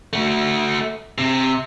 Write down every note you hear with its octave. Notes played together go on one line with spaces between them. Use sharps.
A3 F#4
C3